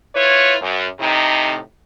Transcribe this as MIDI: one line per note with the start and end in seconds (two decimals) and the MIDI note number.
0.15 0.55 64
0.15 0.55 65
0.15 0.55 71
0.15 0.55 73
0.62 0.87 42
1.01 1.57 45
1.01 1.57 48
1.01 1.57 63